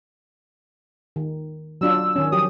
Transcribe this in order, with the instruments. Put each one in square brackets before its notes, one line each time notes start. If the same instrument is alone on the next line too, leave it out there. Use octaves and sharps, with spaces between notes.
[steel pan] D#3
[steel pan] F#3 D4 F4 [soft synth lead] E6
[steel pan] D#3 C#4
[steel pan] F3 F#3 G4 [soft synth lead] D#6